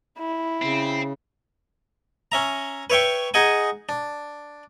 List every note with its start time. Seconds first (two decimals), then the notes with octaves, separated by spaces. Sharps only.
0.18 E4
0.62 C#3 C4
2.32 C#4 E5 A#5
2.90 B4 C#5 E5 G5 C#6
3.34 D#4 G#4 D#5 F#5 G#5
3.89 D4